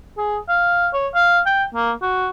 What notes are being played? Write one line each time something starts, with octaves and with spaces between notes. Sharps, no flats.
G#4
F5
C#5
F5
G5
A#3
F#4